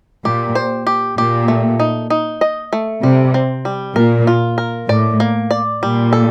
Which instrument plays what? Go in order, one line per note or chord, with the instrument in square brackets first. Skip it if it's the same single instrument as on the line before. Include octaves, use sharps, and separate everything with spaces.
[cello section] A#2 [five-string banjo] G4
[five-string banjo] C5
G4
[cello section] A#2 [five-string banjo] G4
[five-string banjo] A3
D#4
D#4
D#5
A3
[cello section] C3 [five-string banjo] G3
[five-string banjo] C4
G3
[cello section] A#2 [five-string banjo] A#4
[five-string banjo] F4
A#4
[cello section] A2 [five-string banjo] D5
[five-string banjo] A#3
D5
[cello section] A#2 [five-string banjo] G3
[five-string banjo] A4